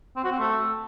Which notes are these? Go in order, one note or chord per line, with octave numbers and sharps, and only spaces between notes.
C4
F#4
C4
A3